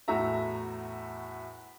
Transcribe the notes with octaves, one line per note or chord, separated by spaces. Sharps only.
E2 A2 A3 F#4 E5 A#5